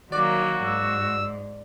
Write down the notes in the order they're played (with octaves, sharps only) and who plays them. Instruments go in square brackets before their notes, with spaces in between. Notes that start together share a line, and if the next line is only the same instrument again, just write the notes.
[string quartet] D#3 F#3 A#3 [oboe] F#4 [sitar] D5
[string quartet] G#2 [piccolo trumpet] E6